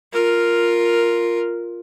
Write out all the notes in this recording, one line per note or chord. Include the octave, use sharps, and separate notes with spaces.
F4 A#4